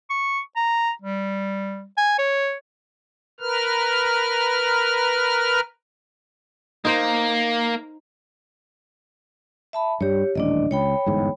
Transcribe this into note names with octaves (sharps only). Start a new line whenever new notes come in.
C#6
A#5
G3
G#5
C#5
A#4 B4 F6
A#3 D#4 C5
E5 A5 B5
G2 G3 G4 C#5
D#1 A1 D4 D5 D#5
C#2 C#5 G5 B5
G1 E2 G#2